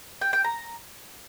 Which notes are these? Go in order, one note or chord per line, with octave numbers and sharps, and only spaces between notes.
G5
G5
A#5